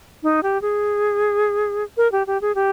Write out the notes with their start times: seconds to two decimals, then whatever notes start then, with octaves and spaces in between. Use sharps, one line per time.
0.23 D#4
0.43 G4
0.62 G#4
1.97 A#4
2.12 G4
2.27 G4
2.41 G#4
2.55 G4